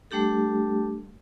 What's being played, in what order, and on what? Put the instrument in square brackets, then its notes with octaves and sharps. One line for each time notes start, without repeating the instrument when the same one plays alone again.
[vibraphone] G3 A3 D4 G4 A4